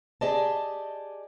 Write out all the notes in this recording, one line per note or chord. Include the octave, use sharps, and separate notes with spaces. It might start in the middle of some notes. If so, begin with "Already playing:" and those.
G4 G#4 D5 D#5 A5